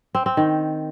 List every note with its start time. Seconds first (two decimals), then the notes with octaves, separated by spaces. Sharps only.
0.15 C4
0.26 C4
0.37 D#3